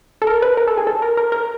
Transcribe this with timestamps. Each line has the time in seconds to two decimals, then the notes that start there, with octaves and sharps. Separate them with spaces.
0.22 A4
0.27 A#4
0.42 B4
0.57 A#4
0.67 A4
0.77 G#4
0.87 A4
1.02 A#4
1.17 A#4
1.32 A#4